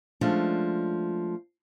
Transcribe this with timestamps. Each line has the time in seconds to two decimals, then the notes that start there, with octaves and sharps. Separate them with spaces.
0.21 F3 G#3 A3 C#4 D4